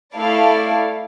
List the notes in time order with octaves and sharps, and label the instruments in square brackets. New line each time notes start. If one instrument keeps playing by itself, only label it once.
[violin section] A3 E4 A4 D5 F5